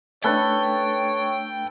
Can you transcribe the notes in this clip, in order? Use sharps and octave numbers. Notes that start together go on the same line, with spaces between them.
A3 D4 A4 B4 C#5 G5 A5